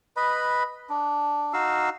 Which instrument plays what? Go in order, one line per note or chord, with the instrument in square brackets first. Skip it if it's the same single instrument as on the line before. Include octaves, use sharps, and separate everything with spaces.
[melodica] B4 D#5 B5
D4
D#4 F#4 F5 E6